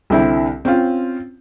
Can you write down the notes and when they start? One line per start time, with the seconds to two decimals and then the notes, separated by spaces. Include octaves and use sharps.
0.10 C2 D3 C4 E4
0.65 C4 C#4 F4